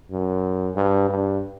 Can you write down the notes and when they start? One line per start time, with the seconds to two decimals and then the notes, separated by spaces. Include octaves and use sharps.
0.11 F#2
0.76 G2
1.09 G2